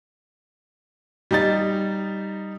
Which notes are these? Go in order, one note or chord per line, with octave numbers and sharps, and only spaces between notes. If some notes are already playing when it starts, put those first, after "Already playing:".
G3 D#4 A6